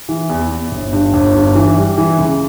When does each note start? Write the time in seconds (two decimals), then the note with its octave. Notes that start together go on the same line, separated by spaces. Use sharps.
0.09 E3
0.30 E2
0.50 E2
0.71 G1
0.93 G2
1.13 G1
1.34 G2
1.55 E3
1.76 G3
1.98 E3
2.18 C#2